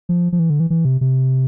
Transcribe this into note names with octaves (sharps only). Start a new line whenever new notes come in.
F3
F3
E3
D3
E3
E3
C3
C3